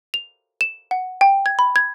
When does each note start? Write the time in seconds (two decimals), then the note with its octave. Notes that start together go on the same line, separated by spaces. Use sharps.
0.14 F7
0.61 E7
0.91 F#5
1.21 G5
1.46 G#6
1.59 B5
1.76 G#6